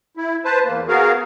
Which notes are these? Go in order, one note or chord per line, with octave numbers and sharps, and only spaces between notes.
E4
B4 C5 A5
E2 A#3
B3 F#4 G#4 A#4 F5